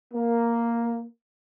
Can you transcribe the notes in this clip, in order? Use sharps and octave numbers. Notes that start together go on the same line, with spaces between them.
A#3